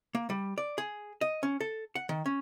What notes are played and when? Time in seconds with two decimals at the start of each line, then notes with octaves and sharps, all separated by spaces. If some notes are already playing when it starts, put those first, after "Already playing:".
0.15 A#3
0.30 G3
0.58 D5
0.78 G#4
1.21 D#5
1.43 C#4
1.61 A4
1.95 F#5
2.09 D#3
2.26 C#4